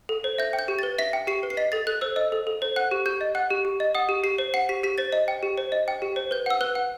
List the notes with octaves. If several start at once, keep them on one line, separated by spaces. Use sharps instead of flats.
A4
C5
E5 G6
G5
G6
G4
B4 A6
E5 B6
G5
G4 C7
B4
C7
D#5 B6
A4 A6
A4 F#6
C5 E6
D#5 E6
A4
A4
C5
F#5 F#6
G4
G4 G6
D#5
F#5 F#6
G4
G4
D#5
F#5 D#6
G4
G4 C7
C5
F#5 C7
G4 B6
G4 B6
C5 A6
D#5
G5
G4
C5
D#5
G5
G4
C5
B4 G6
F#5 E6
B4 F#6
F#5